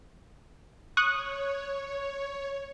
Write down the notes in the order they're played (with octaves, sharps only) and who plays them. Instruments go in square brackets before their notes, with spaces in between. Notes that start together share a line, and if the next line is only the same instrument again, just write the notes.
[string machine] C#5 [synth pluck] C#6 D#6 F#6